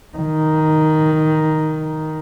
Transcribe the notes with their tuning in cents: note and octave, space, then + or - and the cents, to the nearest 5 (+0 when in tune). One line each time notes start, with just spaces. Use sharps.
D#3 +5